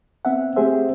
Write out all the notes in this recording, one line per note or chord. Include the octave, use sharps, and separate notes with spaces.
B3 C4 E5 F#5
A3 C4 G4 G#4 C5 E5